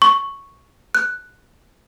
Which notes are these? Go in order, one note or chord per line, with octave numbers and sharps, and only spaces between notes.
C#6
F#6